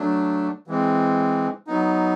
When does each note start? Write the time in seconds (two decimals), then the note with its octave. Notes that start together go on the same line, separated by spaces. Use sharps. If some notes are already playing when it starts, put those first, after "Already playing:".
Already playing: F#3 A3 D4
0.67 E3 G#3 C4
1.67 F#3 B3 D#4